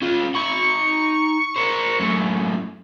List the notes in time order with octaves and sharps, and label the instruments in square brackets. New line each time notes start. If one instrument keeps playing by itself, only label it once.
[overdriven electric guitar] C#4 F4
[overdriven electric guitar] D#4 B5 [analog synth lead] C#6
[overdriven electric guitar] A#4 C5
F#2 A2